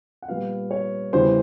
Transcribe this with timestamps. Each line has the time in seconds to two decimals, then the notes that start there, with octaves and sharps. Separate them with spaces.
0.22 F#5
0.28 A#2 G3 B3 F5
0.71 C#5
1.12 E2 C#3 E3 G3 C5